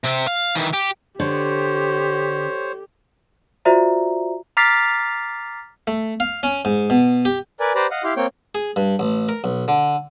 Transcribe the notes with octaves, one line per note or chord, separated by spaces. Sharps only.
C3 C4
F5
D#3 E3
G4
D3 G4 C5 C#5
F4 F#4 C5 D5 E5 A#5
A#5 D6 F6 A6 B6 C7
A3
F5
C#4
G#2
B2
G4
A#4 B4 D5 G#5
G4 B4 C5 D5 A#5 B5
D#5 F5 F#5
E4 G4 F5 C6
A#3 C4 C#5 G5
G#4
G2
A1
A#4
B1
D3